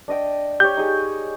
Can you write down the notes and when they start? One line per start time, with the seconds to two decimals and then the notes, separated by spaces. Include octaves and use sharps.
0.08 D4 D#5 G5
0.60 G4 C#5 G6
0.77 D#4 G#4